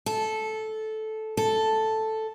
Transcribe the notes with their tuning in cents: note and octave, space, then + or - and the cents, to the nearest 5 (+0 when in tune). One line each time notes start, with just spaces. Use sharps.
A4 -10
A4 +0